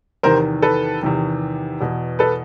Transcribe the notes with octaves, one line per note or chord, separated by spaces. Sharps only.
E2 C3 D#3 A#4 C5
A4 B4
E2 C3 D#3
E2 B2
A4 B4